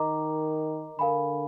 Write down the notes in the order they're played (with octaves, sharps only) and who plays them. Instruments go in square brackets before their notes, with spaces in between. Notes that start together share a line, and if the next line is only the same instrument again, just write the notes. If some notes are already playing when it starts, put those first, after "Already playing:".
Already playing: [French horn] D#3 [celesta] A#4 D#5 A#5 D6
[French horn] D3 [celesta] A#4 F5 G#5 B5